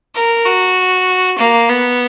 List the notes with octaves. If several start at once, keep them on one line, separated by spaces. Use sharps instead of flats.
A#4
F#4
A#3
B3